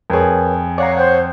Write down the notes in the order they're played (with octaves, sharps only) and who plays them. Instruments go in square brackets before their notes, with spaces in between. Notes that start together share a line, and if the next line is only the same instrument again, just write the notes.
[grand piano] F2 G#4 [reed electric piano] A#4 B4 C#5
[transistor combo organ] C#5 [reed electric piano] D5 F#5 A#5 [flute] F5
[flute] C5 [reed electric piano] F#5 G5 C6